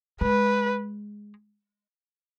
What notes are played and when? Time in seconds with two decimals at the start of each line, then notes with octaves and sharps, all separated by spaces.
0.21 G#3 B4